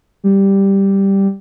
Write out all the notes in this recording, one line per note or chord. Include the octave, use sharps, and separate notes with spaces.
G3